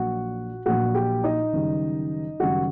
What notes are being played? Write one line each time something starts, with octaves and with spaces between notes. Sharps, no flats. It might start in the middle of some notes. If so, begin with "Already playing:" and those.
Already playing: A#1 A#2 F#3 F#4 F#5
A#1 A#2 F#3 F#4 F#5
G4 G5
D#4 D#5
F#1 F#2 D#3 G3
F#1 F#2 D#3 G3 F#4 F#5